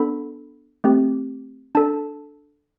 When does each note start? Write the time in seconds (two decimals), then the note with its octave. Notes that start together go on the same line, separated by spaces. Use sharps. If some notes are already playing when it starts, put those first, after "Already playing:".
Already playing: B3 D4 A4 B5
0.84 A3 C4 G4
1.75 D4 A4 A5